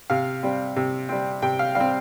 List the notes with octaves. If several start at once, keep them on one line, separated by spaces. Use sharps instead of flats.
C3 F5
G3 C4
C3
G3 C4
C3 G5
F5
G3 C4 F5